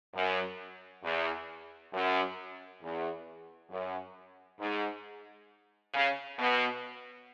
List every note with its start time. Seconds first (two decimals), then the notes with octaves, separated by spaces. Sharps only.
0.14 F#2
1.04 E2
1.94 F#2
2.83 E2
3.71 F#2
4.60 G#2
5.94 C#3
6.39 B2